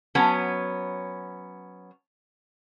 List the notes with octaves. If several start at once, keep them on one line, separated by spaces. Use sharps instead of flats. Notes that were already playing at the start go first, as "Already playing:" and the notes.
F#3 B3 C#4